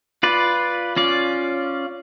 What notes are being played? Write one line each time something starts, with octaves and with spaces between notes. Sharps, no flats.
F4 B4 D5
C#4 F4 D5